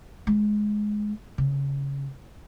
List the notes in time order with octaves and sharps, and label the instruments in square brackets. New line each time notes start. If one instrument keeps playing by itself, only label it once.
[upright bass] G#3
C#3